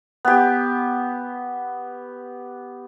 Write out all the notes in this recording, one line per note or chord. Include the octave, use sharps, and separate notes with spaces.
B3 G4